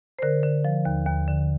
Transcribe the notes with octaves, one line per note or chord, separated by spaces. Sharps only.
C5
D3 A#4
D3
F3
D#2
D#2
D3